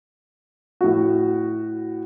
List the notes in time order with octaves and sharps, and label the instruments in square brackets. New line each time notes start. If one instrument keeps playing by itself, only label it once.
[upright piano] A2 F#4